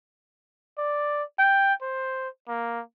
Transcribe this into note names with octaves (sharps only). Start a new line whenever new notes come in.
D5
G5
C5
A#3